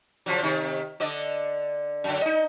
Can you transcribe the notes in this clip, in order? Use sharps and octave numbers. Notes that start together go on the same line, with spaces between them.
C#3 F3 F#3
C3 D#3
D3 D5 D#5
F#2 D3
D#4 D#5